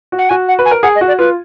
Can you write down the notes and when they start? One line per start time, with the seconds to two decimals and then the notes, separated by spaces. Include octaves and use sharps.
0.12 F#4
0.19 F#5
0.29 F#4 G#5
0.48 F#5
0.59 B4
0.65 G#5
0.71 A#4
0.83 G#4 F#5
0.95 D#5
1.01 F#4
1.08 D5
1.19 F4 B4